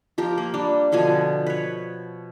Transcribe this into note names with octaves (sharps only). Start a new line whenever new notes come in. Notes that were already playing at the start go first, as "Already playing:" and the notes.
F3 G4 A#4
A#3
G3 D4
B2 D3 F3 G#5
B4 C#5